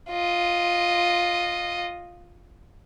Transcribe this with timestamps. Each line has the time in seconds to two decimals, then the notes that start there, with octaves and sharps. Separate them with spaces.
0.10 F4 D#5